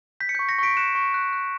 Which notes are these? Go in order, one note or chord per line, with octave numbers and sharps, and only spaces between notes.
G6 B6
C#7
G6 B6
C#6
A#6 C#7
C#6 B6 D7
F#6 C#7 E7
C#6
F#6
F#6